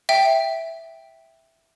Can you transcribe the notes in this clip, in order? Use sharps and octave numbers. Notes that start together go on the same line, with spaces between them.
E5 G5